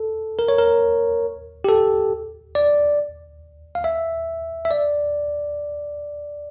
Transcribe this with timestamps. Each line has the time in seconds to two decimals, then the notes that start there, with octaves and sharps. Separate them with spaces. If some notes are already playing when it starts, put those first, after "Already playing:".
Already playing: A4
0.39 A#4
0.48 C#5
0.58 A#4
1.64 G4
1.69 A4
2.55 D5
3.75 F5
3.84 E5
4.65 E5
4.71 D5